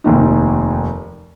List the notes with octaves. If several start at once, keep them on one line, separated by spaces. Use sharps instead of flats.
F1 D#2 D#4